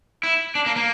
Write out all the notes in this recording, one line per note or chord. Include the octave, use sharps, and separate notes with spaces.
E4
D4
A#3
A#3